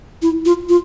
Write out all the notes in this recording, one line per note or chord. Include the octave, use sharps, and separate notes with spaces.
E4
F4
F4